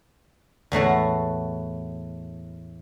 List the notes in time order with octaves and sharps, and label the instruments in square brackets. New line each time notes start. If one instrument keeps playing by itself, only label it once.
[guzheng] E2 A2 A3 F#4